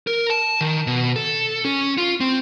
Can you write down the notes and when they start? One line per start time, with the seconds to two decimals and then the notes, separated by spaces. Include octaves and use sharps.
0.07 A#4
0.30 A5
0.61 D#3
0.87 B2
1.16 A4
1.65 C#4
1.98 F4
2.20 C4